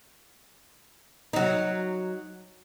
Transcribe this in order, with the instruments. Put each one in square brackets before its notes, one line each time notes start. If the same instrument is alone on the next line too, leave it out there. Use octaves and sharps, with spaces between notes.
[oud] F#3 D#4